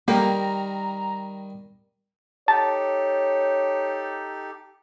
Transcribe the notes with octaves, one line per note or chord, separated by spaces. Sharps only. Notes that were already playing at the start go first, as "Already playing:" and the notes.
D#3 G3 A#3 G4 A#4 D#5 A#5
D#4 G4 A4 C#5 A5